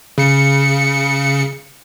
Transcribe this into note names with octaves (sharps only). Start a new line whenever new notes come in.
C#3 C#7